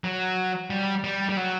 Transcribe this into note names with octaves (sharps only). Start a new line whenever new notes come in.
F#3
G3
G3
G3
F#3